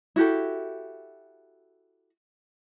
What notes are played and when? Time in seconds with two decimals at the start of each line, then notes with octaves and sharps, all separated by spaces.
0.16 E4 F#4 G4 A4